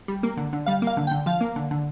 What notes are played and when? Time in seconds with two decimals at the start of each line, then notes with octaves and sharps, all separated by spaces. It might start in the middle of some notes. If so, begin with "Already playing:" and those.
0.08 G3
0.23 A#3
0.37 D3
0.53 D3
0.66 G3 F5
0.82 A#3
0.87 F5
0.97 D3
1.07 G5
1.11 D3
1.26 F3 F5
1.41 A#3
1.56 D3
1.71 D3